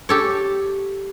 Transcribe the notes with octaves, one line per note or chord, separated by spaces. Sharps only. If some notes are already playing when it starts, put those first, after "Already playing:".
G4 A4 C#5